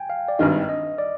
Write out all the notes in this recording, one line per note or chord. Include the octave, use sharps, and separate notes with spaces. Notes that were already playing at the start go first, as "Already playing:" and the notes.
Already playing: G5 G#5
F5
D5
G#1 G2 D#3 D#5
D#5
D5